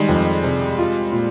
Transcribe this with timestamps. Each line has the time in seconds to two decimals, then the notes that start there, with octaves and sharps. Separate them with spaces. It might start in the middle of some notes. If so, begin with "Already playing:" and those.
Already playing: D#3 G3 G#3
0.09 F2
0.44 C3
0.78 F4
1.13 A#2